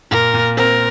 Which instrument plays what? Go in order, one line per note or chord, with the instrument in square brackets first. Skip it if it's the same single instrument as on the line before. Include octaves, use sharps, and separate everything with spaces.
[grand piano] A#2 [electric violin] A#4
[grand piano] A#2
[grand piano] C4 [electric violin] A#4